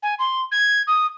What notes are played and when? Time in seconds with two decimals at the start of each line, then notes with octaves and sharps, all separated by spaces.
0.02 G#5
0.19 C6
0.51 G#6
0.87 D#6